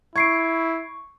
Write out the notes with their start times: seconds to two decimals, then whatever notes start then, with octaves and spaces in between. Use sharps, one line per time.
0.16 E4 C#6 G#6 C7 D7